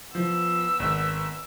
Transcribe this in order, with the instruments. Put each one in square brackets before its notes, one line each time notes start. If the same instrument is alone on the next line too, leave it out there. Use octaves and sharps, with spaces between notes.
[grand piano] F3 [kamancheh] B3 E6
[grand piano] G#1